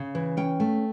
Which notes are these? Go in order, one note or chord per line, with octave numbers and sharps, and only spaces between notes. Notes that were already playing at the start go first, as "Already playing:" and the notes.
Already playing: C#3
E3
C#4 G5
A3